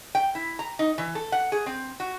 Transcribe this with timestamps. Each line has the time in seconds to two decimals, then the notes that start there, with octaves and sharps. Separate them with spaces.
0.15 G5
0.35 E4
0.59 A#5
0.79 D#4
0.98 E3
1.15 A4
1.32 F#5
1.52 G#4
1.66 C4
2.00 F#4